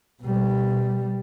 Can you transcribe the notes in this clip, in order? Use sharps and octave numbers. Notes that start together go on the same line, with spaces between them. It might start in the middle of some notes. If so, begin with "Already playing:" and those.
B2 G3